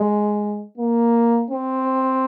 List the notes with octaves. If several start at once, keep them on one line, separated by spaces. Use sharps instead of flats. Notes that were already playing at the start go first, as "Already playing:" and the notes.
Already playing: G#3
A#3
C4